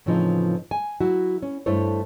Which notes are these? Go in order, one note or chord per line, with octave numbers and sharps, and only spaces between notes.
A2 C#3 E3 F3 C4 D#4
G#5
F#3 E4 F#4
C#4
G2 A3 E4 C5 C#5